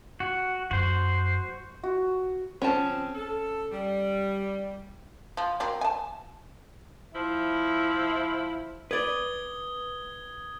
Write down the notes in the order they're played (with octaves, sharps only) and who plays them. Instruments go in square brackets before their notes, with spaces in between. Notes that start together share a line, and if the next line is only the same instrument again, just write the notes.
[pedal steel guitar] F#4
[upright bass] F#2 [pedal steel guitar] F#4 C5
[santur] F#4
[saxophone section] C#3 F3 C4 [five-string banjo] C#4 A5
[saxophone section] A4
G3
[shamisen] F3
F#3 A#3 C4
G#5 A5
[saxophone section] F3 E4
[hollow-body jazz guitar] B4 D5 [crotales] D#6 G#6 G7